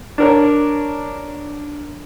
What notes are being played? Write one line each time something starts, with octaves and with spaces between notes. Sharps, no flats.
D4 A#4 C#5